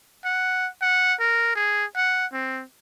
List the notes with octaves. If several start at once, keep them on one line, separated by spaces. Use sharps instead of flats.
F#5
F#5
A#4
G#4
F#5
C4